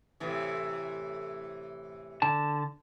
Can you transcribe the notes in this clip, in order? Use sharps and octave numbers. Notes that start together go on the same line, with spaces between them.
A2 C3 E3
D3 A5